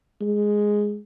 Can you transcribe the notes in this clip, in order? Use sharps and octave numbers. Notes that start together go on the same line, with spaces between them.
G#3